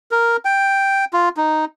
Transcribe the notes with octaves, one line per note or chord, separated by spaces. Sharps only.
A#4
G5
F4
D#4